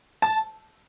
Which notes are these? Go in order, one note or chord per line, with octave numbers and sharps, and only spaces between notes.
A5